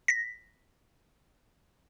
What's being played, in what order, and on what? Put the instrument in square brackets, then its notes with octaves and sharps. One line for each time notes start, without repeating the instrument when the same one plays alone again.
[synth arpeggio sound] A#6 B6